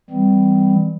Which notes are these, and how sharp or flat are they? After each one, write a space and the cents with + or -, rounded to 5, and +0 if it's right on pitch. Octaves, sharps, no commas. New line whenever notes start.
E3 +0 G3 +10 C4 -25